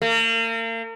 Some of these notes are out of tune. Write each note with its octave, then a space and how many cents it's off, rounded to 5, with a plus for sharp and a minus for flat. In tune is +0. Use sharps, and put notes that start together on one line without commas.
A#3 -40